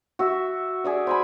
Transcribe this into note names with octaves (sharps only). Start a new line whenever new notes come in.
F#4 E5
G#4 D5 E5
C5 G#5 B5